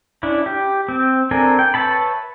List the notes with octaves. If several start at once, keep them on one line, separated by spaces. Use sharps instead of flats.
C#4 D4 E4
G4
C4
C4 D4 A4 A#4 G#5
G5
B4 C#5 E5 A5 B5